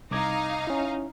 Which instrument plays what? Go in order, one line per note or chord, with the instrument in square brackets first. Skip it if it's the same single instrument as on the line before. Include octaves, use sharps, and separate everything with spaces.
[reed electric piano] C2 D6 G#6 [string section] D#4 F5
[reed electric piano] C#4 E4